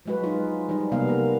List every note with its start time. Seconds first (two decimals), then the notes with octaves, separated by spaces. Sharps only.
0.06 F3 F#3 G#3 F#4 B4
0.24 D#4 F4
0.69 F3 G3 D#4
0.92 C3 A#3 B3 F5
1.08 F3 A#4